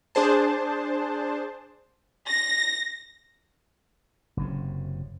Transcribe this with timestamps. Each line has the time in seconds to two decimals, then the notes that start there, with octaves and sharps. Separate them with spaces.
0.15 D4 G#4 C5 A5
2.29 A#6
4.37 F#1 F#2 C3